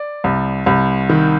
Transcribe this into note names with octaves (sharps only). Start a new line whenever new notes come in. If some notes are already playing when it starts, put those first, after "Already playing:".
Already playing: D5
C2
C2
D#3